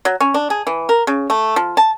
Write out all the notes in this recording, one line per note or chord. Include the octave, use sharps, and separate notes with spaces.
F#3
C#4
D4
G#4
E3
A#4
C#3
A3
F3
A5